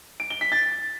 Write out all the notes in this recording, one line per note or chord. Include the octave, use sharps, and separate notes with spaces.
D7
G7
B6
A6